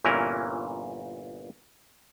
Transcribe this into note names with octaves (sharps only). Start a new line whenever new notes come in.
G1 A#2 E3 C#4 A#4